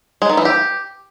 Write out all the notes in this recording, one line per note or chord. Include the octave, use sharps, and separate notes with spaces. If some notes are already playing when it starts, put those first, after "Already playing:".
G#3
D#3
E3
G4